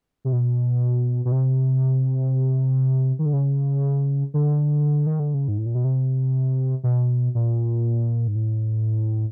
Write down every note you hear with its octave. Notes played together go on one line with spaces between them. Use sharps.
C3
B2
B2
C3
D#3
D3
C#3
D3
D#3
D3
C#3
G#2
A2
A#2
B2
C3
B2
A#2
G#2
A2